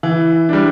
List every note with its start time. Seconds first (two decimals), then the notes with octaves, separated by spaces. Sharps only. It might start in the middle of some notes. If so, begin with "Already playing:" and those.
0.03 E3
0.49 G3 D4